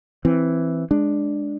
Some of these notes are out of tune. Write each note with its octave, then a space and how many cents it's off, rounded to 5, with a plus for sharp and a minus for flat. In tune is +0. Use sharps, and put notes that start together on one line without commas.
E3 +0 C4 +0
G#3 +0 D4 +0